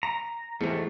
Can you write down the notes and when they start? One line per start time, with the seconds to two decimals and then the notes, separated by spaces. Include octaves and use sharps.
0.03 A#5
0.61 E2 G#2 C3 A3